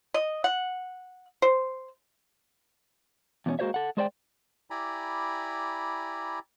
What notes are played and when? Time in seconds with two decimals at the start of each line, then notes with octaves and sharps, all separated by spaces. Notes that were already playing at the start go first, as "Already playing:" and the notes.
0.14 D#5
0.44 F#5
1.42 C5
3.46 E2 B2 E3 C#4
3.59 G#3 A#3 F#4 C5 C#5 E5
3.74 A4 F#5
3.97 G#3 G#4 C5 D5 D#5 G5
4.70 E4 G4 D5 G#5 A#5 B5